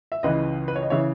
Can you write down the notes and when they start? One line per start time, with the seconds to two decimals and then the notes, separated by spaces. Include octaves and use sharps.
0.12 E5
0.23 C#2 C#3 E3 B4 D#5
0.68 B4
0.76 C#5
0.82 D#5
0.90 C#3 E3 C#5 E5